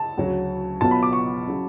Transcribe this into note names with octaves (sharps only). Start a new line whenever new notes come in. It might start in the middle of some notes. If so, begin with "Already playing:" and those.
Already playing: A5
D2 C#3 F#3 C#4
B1 B2 F#3 B3 F4 A5
B5
D6
C#6
C#3 F#3